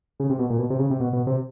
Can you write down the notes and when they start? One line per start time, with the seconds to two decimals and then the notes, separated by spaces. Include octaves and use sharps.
0.20 C#3
0.30 C3
0.39 B2
0.50 A#2
0.59 B2
0.70 C3
0.79 C#3
0.90 C3
1.00 B2
1.13 B2
1.27 C3